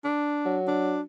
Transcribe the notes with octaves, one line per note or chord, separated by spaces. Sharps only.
D4
F#3
D4